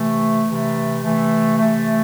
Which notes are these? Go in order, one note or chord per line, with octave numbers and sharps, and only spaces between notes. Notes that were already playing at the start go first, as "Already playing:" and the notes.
Already playing: C3 E3 A3
C3 E3 A3
C3 E3 A3
C3 E3 A3